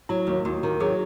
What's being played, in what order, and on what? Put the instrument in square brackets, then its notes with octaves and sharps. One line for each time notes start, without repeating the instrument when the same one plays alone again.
[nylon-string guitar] F#3 [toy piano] E4
[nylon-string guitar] D#2
[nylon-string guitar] D#2 [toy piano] F#4
[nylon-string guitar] D#3
[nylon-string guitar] F#3 [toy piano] G#4